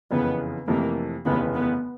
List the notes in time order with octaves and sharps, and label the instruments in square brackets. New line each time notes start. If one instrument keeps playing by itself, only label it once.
[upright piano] F#1 F2 C#3 E3 [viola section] B3
[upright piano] F2 C3 E3 A3 [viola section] A#3
[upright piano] F1 D#2 C#3 E3 [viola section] B3
[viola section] B3